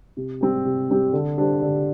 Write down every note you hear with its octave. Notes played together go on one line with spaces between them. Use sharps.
C3
G3 C4 G4
C3
G3 C4 G4
D3
G3 D4 G4 C5
D3